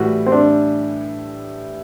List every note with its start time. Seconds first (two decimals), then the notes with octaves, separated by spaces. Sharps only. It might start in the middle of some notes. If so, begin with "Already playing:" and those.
Already playing: A2 E3 G3 F#4
0.26 C4
0.32 D4